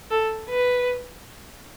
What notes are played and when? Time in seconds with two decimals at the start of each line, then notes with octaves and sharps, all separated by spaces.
0.11 A4
0.50 B4